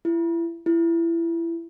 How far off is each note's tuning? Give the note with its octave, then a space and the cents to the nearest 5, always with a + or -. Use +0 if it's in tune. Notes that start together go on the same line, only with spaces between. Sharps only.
E4 +30
E4 +25